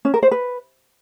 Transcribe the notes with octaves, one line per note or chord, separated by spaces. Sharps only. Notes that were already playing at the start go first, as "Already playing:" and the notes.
C#4
A#4
C5
B4